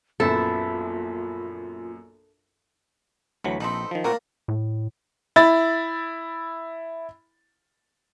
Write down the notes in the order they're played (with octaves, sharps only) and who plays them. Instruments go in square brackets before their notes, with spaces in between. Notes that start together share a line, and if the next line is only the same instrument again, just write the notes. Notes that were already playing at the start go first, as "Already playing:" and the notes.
[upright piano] A#1 F#2 B3 [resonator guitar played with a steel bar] E4 [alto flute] F4 [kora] A4
[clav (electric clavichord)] D2 E3 F#3 [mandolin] F#5 B5
[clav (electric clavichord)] A#1 [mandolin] C4 A4 B4 [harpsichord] D#4
[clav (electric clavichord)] D#3 F3
[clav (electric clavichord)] A#2 C4 F#4 [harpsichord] A#3 A#4 [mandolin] D4 A#5
[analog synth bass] A2
[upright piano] E4 B5 A6